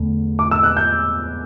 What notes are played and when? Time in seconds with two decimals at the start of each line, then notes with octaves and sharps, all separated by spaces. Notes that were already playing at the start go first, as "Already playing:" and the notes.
Already playing: E2 D3 A3
0.39 D6
0.51 E6
0.63 F#6
0.77 G6